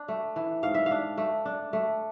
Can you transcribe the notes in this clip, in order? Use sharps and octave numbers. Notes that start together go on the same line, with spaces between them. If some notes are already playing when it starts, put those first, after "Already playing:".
Already playing: D4
A3
E3
G#2 F5
E5
F5
D4
A3
D4
A3